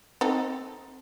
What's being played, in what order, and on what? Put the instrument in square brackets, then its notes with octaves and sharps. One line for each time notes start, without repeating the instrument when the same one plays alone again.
[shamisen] C4 D#4 A4